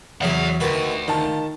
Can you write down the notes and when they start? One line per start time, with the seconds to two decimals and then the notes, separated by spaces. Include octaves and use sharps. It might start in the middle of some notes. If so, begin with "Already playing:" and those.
0.21 E2 F#3 G#4 E5 F#5
0.60 D2 D#3 F#4 B4
1.08 D#3 F4 A5